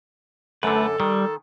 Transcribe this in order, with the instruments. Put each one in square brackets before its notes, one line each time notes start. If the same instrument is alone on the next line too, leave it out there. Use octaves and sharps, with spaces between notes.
[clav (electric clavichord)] F#2 D3 [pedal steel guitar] A3 B4 [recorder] A4
[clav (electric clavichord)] D#3 [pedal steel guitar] G3